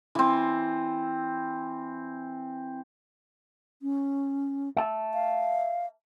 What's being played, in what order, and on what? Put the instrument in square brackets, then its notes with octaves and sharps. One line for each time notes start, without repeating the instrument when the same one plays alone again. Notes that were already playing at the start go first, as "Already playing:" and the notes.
[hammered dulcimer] E3 C4
[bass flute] C#4
[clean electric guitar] E5 A5
[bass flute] F5